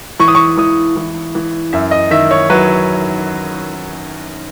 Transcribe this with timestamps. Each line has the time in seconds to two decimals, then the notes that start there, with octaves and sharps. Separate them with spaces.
0.20 E3 C#6
0.28 D#6
0.35 C#6
0.57 E3 D#6
0.96 E3
1.35 E3
1.73 F#2 E5
1.91 D#5
2.11 D#3 E5
2.31 C#5
2.50 F#3 B4